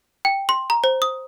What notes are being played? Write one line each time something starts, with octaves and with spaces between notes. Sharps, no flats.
G5
C6
A#5
C5
D#6